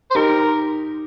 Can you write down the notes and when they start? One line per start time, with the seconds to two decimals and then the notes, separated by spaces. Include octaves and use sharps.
0.10 C5
0.15 D#4 G4 A#4